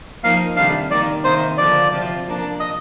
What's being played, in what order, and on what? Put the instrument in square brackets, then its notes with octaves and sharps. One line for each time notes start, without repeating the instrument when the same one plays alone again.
[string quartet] F3 A#3 D#4 [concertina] F5
[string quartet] C3 D#3 G3 D4 [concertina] F5
[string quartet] D#3 A#3 D#4 [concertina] D5
[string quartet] C3 D#3 A#3 D#4 [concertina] C5
[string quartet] D3 F3 A#3 [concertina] D5
[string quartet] C3 F3 C4 F4
F3 A#3 D4
[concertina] D#5